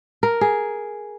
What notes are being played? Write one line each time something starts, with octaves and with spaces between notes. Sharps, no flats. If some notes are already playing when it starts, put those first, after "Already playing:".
A#4
G#4